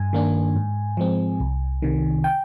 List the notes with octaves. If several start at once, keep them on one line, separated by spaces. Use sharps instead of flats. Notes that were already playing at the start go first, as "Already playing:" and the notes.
Already playing: G2 G#5
D#3 A#3 D4
G#2
F3 G#3 C4
C2
C3 D#3
G5